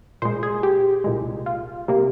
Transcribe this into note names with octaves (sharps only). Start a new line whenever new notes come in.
A#2 G#3 C5
G#4
G4
C2 A#2 G#3
F4
C3 G3 A#3